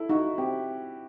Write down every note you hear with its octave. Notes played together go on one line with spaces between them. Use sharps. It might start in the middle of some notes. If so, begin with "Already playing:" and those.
Already playing: E4 A4
D#4 F#4
C4 G4